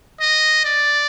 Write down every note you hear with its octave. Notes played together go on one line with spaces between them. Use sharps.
D#5
D5